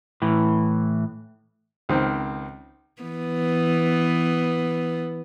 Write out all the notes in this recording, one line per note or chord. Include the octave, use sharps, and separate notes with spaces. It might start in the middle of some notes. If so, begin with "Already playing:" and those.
A2 E3
C#2 D#3 C4
E3 B3